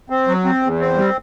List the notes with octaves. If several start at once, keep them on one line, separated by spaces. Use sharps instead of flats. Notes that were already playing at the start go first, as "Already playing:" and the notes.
C4
F#3
C4
E2
C4
G3